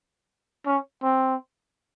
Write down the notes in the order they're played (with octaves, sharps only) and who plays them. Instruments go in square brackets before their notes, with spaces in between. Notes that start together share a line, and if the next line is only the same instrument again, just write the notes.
[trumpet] C#4
C4